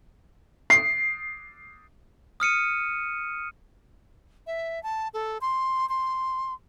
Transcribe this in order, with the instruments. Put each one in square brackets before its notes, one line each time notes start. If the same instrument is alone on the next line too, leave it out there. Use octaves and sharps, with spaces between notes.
[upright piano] C7
[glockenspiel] D#6 F6 C#7 D#7
[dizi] E5
A5
A4
C6
C6